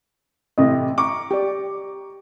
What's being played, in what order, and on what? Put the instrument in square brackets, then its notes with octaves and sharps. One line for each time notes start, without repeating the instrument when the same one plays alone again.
[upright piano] A1 C3 A3 [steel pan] D#5
[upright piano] A#5 C#6 D6
[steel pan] G4 D5